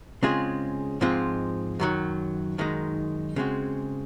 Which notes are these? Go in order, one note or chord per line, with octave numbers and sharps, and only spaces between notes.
C#3 G#3 C4 F4 G#4
G#2 F3 G#3 C4 F4
F#2 D#3 F#3
F#2 D#3 G#3 D#4
C#3 G#3 C4 F#4